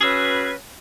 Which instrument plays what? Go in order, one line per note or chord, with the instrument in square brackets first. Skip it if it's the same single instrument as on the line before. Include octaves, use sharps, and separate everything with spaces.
[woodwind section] C#4 F#4 B4 [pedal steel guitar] G#4 E6